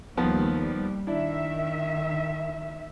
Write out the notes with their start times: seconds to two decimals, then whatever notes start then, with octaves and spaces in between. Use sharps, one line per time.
0.17 D#2 D#3 F3 G3 B3
0.60 G3
1.07 D#3 D4 E4 E5